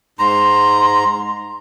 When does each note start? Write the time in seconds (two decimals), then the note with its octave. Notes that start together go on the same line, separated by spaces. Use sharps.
0.19 G#2 A#5 C6